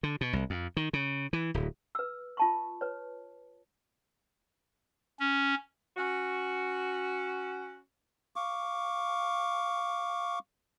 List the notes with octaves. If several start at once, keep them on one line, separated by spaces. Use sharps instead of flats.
D3
B2
C2
F2
D#3
C#3
E3
D1
B4 E6
F4 A5 C#6
B4 C#5
C#4
C#4 F#4
F5 C#6 D6